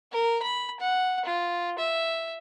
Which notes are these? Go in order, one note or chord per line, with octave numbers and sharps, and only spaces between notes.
A#4
B5
F#5
F4
E5